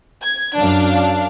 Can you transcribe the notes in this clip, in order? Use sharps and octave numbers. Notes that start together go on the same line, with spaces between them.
G#6
F#2 D4 F5